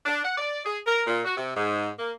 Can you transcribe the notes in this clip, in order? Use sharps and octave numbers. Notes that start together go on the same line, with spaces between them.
D4
F#5
D5
G#4
A#4
A#2
F#4
C3
G#2
A#3